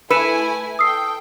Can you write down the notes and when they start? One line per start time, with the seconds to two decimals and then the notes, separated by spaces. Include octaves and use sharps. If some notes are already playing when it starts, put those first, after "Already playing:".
0.10 A3 E4 B4 G#5 E6 C#7 E7
0.79 A4 G5 D#6 E6 C7